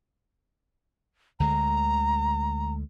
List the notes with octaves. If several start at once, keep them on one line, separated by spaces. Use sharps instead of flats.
D2 D3 G#3 A#5